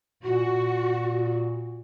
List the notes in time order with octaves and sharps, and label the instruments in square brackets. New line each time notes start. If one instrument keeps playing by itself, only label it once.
[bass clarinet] A#2 [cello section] F#4